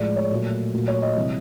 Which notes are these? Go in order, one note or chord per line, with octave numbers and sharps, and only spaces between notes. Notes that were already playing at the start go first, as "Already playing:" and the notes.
Already playing: A2 F3 G#3 D5
C#5
A#2 F#3 A3
A#2 F#3 A3
C#5
D#5
C3 E3 G3